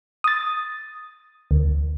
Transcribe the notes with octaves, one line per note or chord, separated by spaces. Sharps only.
D#6 A6
D2